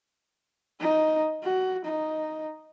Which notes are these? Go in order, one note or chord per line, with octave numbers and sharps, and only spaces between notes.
D#4
F#4
D#4